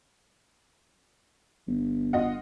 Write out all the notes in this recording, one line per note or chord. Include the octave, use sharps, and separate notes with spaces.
G1
F4 D#5 F#5